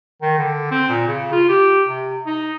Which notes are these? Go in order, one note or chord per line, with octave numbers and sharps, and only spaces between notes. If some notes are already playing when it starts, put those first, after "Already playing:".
D#3
D3
C4
A#2
C#3
F4
G4
C3
D#4